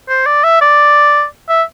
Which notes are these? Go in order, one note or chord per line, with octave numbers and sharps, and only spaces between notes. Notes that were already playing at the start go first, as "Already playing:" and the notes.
C5
D5
E5
D5
E5